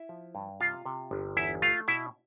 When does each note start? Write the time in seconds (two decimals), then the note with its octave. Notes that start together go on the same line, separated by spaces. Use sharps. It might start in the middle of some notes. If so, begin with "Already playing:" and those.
Already playing: E4 E5
0.09 F3
0.35 G2
0.60 C3 F4 F5
0.85 C3
1.11 G1
1.37 E2 E4 E5
1.62 A3 F4 F5
1.88 B2 E4 E5